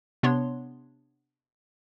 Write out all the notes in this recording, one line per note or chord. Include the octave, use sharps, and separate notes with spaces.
C3 B3 D4 C#5 C6